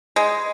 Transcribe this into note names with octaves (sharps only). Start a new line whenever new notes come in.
G#3